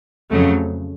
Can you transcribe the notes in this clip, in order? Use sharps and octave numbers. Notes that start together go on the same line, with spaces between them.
F2 C#3 F#3 A3